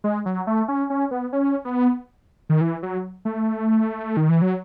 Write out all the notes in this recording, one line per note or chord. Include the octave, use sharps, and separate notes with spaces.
G#3
F#3
A3
C#4
C#4
B3
C#4
B3
D#3
E3
F#3
A3
D#3
E3
F#3